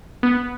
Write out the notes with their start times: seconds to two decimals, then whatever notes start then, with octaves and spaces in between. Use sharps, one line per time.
0.23 B3